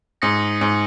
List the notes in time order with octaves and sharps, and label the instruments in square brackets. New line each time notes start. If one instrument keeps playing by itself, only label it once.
[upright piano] G#2 [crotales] D#6 A#6 C#7
[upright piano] G#2